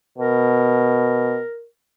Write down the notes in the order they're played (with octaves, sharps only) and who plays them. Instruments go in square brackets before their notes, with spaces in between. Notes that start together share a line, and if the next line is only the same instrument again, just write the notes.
[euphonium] B2 [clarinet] A#4